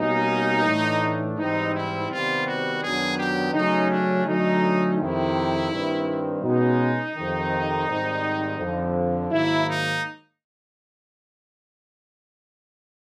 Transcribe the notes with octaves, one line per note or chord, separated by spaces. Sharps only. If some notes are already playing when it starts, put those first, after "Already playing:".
Already playing: B2 G3 A#3 C#4 D#4
A2 E3 A3 D4
G#2 E3 G3 C4 D#4
E4
C3 D#3 G3 B3 F4
F#4
F#2 D#3 F#3 B3 D4 G#4
G4
C#3 F#3 A3 C#4 D#4
D4
D3 F#3 A3 C#4 D#4
F2 C3 D#3 E4
G2 D#3 G3 C4
B2 G#3 C#4 D#4
F2 C3 D#3
G#2 D#3 G3 C4
F2 D3 F3
G#2 D#3 F#3 A#3 E4
D#4